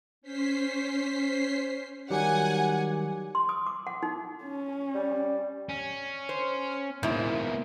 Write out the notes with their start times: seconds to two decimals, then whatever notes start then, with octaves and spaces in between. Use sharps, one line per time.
0.22 C#4 C5 B6 C7
2.10 D#3 F#3 G3 G4 F#5 G#5
3.35 C6
3.49 D#6
3.67 D6
3.87 F#5
4.03 D#4
4.44 C#4
4.94 G3
5.69 C#4
6.29 C5
7.03 G#2 B2 A#3 E4